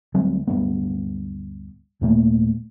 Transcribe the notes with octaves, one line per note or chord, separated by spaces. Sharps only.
D2 F#3 G3 C4
D1 G2 B3
D#2 A#2 A3 A#3